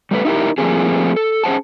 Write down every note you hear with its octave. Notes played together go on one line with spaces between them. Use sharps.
G3 A3 A#4 B4
D#4 E4 G4 A#4
F3 G3 A3 A#3 C4 G#4
A4
C#4 G#4 C5 F#5 A5